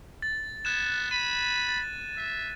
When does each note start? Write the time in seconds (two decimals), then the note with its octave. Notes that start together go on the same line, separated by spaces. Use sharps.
0.22 A6
0.65 B3 F#6 G#6 E7
1.11 B5 D#7
1.69 A6
2.17 E5